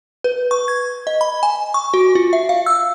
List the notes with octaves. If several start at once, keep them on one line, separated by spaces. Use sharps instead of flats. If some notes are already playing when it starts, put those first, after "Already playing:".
B4
C#6
G#6
D#5
B5
G#5
C#6
F#4
F4
E5
F5
E6